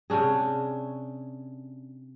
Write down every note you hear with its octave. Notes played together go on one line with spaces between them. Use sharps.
C3 C#4 D4 G#4